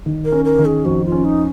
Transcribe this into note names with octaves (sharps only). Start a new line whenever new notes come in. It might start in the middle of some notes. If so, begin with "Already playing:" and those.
D#3
A#4
C#4
A#4
D#3
G#4
F2 F#4
F4
C#4
D#4